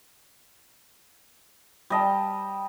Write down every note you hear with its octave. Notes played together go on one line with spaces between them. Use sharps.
G3 D#5 A5